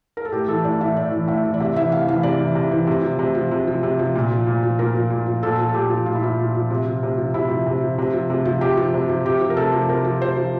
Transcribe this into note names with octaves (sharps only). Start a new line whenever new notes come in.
A#4
A4
A2 G4
E3 A4
A2 D5
E3 E5
A2 D5
E3
A2 E5
E3
D5
C3 E5
E3 E5
C3 F5
E3 F5
C3 D5
E3
C3
E3
C3
F3
C3
F3
C3
F3
C3
F3
A#2
F3
A#2
F3
A#2 A#4
F3
A#2
F3
A#2 A4
F3
A4
A#2 G4
F3
A#2 F4
E4
F3 F4
A#2
F3
C3
F3
C3
F3
C3 E4
F3
C3
F3
C3
F3
C3
F3
C3 G4
F3
C3
F3
C3 G4
F3
A#4
C3 A4
F3
C3 A#4
F3
C3 C5
F3